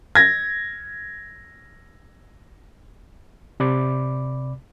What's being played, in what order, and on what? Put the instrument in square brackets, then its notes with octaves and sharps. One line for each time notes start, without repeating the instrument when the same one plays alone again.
[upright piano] G#6 A#6
[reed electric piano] C3 D5 B5 D6